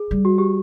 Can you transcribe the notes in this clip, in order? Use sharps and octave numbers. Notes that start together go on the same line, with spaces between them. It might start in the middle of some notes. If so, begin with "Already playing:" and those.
Already playing: G#4
G3
F#4
G4